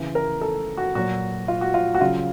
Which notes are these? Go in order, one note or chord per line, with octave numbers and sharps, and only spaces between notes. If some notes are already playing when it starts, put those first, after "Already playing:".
Already playing: C#3 E3
A#4
A4
F#4
A#2 F#3 F#4
F4
F#4
F4
F#4
C#3 F#3 F4